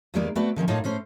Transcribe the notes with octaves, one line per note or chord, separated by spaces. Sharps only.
E2 D#3 G3 G#3 A#3 D5
A3 B3 C4 F#4 B4 D5
D3 D#3 F3 C#4
A2 A#3 D#4 F4 C#5 A5
A2 A3 C#4 C5